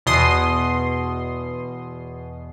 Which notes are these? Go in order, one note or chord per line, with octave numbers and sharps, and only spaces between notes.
E2 B2 C6 D#6